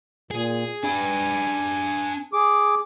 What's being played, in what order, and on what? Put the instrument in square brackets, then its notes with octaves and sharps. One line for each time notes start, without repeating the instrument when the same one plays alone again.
[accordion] A#2 [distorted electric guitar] G#4
[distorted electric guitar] D4 B4 [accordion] G#5
[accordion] G#4 D6